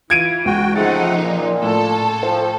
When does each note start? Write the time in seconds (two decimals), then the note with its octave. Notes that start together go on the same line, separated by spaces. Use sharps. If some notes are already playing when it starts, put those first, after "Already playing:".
0.10 E3 F4 G#6 D7 D#7
0.45 C#2 F#4 G5
0.75 C#3 F3 A3 C4 D#4 G#4 F#5 A6
1.17 A#2
1.62 A2 A4
2.23 F3 C5 G5